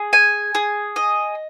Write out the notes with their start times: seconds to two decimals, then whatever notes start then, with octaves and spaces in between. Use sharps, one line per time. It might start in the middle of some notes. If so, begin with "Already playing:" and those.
Already playing: G#4
0.13 G#5
0.55 G#4
0.96 D#5